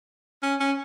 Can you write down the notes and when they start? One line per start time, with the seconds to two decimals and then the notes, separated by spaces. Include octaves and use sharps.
0.43 C#4
0.60 C#4